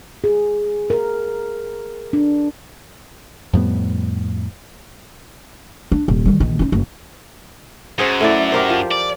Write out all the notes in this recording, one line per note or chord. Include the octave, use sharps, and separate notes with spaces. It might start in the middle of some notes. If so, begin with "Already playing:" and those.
G#4
A#4
D4
F2 A2 G3 B3
D4
D#1
D#3 G3
A#1 D#3
C#4 D#4
F#1
F#2 G#4 C5 F#5
A3 E4 D5
G4 A#4 C5
F3
D5